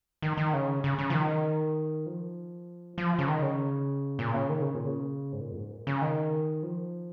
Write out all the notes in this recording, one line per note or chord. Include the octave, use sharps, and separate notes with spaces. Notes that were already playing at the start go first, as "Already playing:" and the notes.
D#3
D#3
C#3
C#3
C#3
F3
D#3
F3
F3
C#3
D#3
C#3
A#2
C#3
D#3
C#3
A#2
C#3
G#2
A#2
F2
G#2
A#2
C#3
D#3
F3